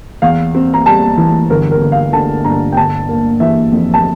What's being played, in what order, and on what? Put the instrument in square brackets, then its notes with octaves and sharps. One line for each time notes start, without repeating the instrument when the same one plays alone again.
[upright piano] E2 F5
C4
A#5
G3 A5
E3
G1 A#4
A#4
G1
F5
D3 A5
G2 A#5
G5
G1 A5
A#3
E3 E5
F2
A5